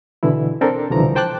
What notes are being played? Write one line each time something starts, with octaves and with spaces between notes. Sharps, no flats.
B2 D3 E3 E4
C4 D4 A4 A#4
C2 B2 D3 E3 F3 A#5
C5 G5 A5 D6 F#6